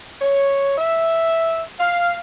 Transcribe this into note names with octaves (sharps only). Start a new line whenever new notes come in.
C#5
E5
F5